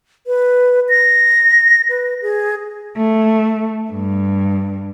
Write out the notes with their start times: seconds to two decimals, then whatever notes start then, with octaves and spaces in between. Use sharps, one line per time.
0.27 B4
0.89 A#6
1.89 B4
2.22 G#4
2.96 A3
3.90 G2